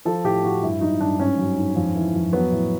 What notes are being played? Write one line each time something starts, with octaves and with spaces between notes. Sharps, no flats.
F3 A4
A2 G4
A2 F#4
G2 E4
F#3 D#4
G2 D4
G#2 C#4
F#3
G#2
F2
E3
F2
F#3 B3
A2